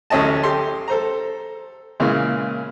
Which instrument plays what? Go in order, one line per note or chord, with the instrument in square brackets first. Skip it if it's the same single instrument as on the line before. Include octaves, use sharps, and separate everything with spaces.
[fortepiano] A1 D2 A3 C#4 D#5 A5
G4 A4 C6
A4 C5 A#5
A#2 C#3 E3 G#3